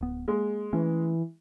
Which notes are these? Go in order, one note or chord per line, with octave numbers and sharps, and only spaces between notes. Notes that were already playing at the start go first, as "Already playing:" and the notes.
D1 B3
G#3 A#3
E3 A3 C#4